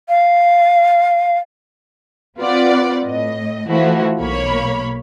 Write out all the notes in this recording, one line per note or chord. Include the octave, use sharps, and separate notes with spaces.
F5
C4 F4 B4 D5 F#5
A2 D#5
E3 F3 A3 E4 F#4
B1 A#3 C#5 B5